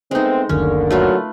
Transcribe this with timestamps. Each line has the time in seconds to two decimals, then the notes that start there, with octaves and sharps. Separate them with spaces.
0.11 G#3 A3 B3 C4 D#4
0.49 F#1 D2 D3 D#3 A#3 C#4
0.91 F#3 A3 F4 B4